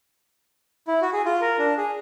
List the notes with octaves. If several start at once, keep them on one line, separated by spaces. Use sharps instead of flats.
E4
F#4
G#4
F4
A#4
D4
G#4